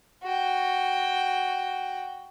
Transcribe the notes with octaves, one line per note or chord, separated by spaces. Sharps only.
F#4 G5